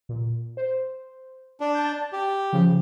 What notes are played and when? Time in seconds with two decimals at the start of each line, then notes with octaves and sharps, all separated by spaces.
0.09 A#2
0.57 C5
1.61 D4
1.75 A5 G6
2.13 G4
2.53 C#3 F3